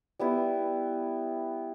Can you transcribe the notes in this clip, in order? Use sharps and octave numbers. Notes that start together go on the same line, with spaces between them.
G3 B3 E4